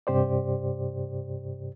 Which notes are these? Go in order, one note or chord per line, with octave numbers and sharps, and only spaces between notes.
G2 C3 G4 C5 D5